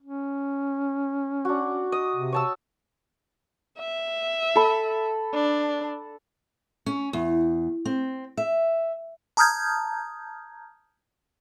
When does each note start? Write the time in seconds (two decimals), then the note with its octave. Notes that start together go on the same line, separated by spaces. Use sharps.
0.02 C#4
1.45 D4 F#4
1.92 D#5
2.16 C3
2.32 C#5 A5 E6
3.79 E5
4.56 A4 B5
5.34 D4
6.86 C#4
7.13 E2
7.85 C4
8.37 E5
9.37 A5 A#5 D#6 F6 G6 G#6